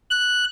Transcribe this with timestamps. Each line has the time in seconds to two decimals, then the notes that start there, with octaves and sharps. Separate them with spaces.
0.10 F#6